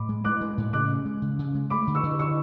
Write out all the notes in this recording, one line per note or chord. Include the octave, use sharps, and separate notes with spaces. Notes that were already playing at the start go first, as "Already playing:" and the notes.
Already playing: A2 B5 D6
G#3
G#3 D6 F#6
G#3
A2
C#3 D6 F#6
C#4
G#3
C#3
C#3
G#3
A3 B5 D6
D3
C#6 E6
D3
D3 C#6 E6